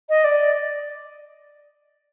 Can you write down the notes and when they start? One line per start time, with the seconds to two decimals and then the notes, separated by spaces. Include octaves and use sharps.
0.09 D#5
0.24 D5